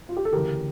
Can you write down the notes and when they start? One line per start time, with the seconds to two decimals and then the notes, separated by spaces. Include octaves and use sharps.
0.09 F4
0.17 G4
0.25 A4
0.32 D2 C#3 E3 G4 A#4